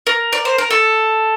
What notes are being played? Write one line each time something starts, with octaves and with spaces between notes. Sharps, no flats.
A#4
D5
C5
A#4
A4